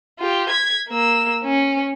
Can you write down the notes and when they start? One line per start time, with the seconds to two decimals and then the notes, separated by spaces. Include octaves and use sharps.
0.19 F4 G4
0.50 G#6 B6
0.89 A#3 E6
1.44 C#4